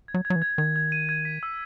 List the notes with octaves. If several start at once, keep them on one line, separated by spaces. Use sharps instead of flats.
G#6
F#3
G#6
F#3
E3
G#6
D#3 G#6
G#6
D#7
G#6
B6
E6